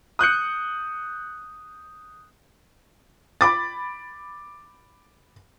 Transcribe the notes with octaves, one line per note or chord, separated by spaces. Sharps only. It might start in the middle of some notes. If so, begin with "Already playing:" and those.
D#6 F#6 G6 C#7
B5 D6 A6